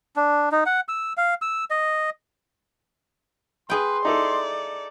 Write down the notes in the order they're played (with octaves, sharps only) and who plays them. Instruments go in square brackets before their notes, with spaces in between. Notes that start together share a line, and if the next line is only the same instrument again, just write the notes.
[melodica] D4
D#4
F#5
E6
F5
E6
D#5
[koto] G#4 G5 [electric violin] B4 [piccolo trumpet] C6
[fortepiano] D#4 E4 A4 [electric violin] D5